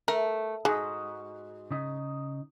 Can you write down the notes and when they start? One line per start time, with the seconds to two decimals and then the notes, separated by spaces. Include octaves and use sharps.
0.08 A3 A#4
0.65 G#2 G#3 F#4 D#5
1.71 C#3 D#4